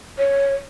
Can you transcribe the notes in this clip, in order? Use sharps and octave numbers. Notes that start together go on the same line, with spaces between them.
C#5